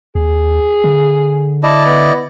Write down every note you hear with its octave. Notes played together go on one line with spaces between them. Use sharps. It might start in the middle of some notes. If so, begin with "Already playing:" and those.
D#2 G#4
D3
E4 D5 D#5 A5
B3